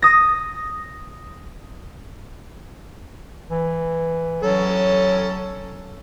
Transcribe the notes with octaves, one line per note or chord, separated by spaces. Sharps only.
D#6 A#6
E3
F#3 C#4 A4